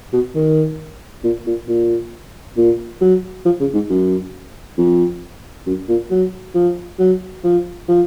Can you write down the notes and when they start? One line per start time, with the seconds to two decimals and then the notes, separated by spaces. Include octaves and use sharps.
0.13 B2
0.35 D#3
1.24 A#2
1.46 A#2
1.68 A#2
2.57 A#2
3.01 F#3
3.45 F3
3.60 C#3
3.74 G#2
3.89 F#2
4.78 F2
5.67 F#2
5.89 A#2
6.11 F#3
6.55 F3
6.99 F#3
7.44 F3
7.88 F3